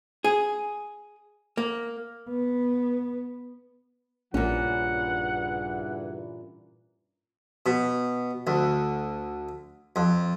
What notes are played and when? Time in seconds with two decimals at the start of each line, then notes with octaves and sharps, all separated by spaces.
0.24 G#4
1.57 A#3
2.29 B3
4.34 A#1 G2 A#2 C#3 E3 C#4 F#5
7.66 B2
8.47 D2
9.96 F2